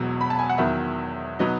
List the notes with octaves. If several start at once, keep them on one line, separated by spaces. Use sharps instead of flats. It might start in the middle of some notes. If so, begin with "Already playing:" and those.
Already playing: E1 E2 B2 F#3
B5
A5
G#5
F#5
E2 D#3 F#3 E5
B2 F#3 B3 D#4